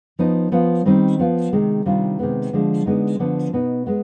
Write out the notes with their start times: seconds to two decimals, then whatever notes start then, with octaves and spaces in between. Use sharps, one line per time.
0.19 F3 B3 D#4
0.52 F3 B3 F4
0.85 D#3 G3 C4 D#4
1.19 F3 B3 F4
1.53 C3 D#3 G#3
1.85 C3 D#3 G3 D4 F4
2.19 C3 D#3 G#3 B3
2.53 D3 F3 G#3
2.86 D3 G#3 B3 D#4
3.19 D3 F3 B3 D4
3.53 B2 B3 D#4
3.87 G#3 B3